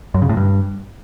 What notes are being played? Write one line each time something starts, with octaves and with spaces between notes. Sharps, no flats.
F#2
C#3
A2
G2